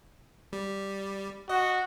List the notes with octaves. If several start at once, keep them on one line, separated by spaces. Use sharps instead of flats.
G3
F#4 D#5